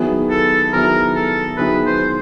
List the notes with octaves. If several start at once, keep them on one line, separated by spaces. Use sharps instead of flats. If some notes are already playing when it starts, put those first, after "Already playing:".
Already playing: D#3 F#3 B3 E4 G#4
A4
D#3 F#3 B3 E4 G#4 A#4
A4
D#3 F#3 B3 E4 G#4 B4
C5